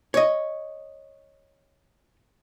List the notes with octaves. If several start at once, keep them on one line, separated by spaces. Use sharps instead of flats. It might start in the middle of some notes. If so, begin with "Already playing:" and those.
C#5 D#5